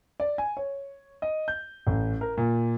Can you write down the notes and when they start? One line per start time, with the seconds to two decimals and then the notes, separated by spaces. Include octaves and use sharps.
0.20 D5
0.38 G#5
0.57 C#5
1.22 D#5
1.48 G6
1.87 A1
2.21 A#4
2.37 A#2